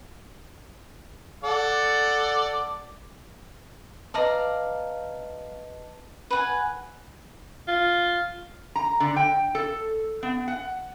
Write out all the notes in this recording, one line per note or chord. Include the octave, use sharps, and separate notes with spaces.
A4 D5 F#5
B4 D5 D#5 F5 A5 A#5
B4 F#5 G#5
F4
A#5
D3
G5
A4
B3
F#5